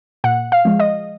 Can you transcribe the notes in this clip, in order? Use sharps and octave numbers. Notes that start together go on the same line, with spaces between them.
A#2 F#5
F5
F3 G#3
D#5